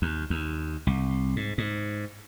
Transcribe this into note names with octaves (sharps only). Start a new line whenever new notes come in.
D#2
D#2
C2
G#2
G#2